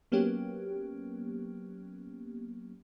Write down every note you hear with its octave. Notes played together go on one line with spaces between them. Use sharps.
F#3 A#3 B3 C#4 G4